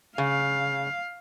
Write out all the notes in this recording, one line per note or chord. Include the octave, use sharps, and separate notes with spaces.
C#3 F5